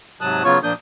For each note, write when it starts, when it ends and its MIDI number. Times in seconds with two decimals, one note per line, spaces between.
0.21 0.43 44
0.21 0.43 48
0.21 0.43 54
0.21 0.43 81
0.21 0.43 87
0.21 0.43 90
0.44 0.58 49
0.44 0.58 54
0.44 0.58 59
0.44 0.58 65
0.44 0.58 73
0.44 0.58 85
0.63 0.73 46
0.63 0.73 53
0.63 0.73 58
0.63 0.73 62
0.63 0.73 87
0.63 0.73 91